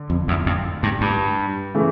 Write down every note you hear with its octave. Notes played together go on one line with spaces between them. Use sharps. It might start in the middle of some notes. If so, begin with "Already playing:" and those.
Already playing: D3
F2
E2
F2
G2
G2
C#3 E3 A3